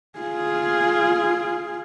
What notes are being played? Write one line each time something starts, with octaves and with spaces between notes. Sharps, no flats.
F4 G#4